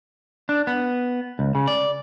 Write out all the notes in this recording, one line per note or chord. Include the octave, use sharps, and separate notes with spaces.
D4
B3
C#2
C#3
D5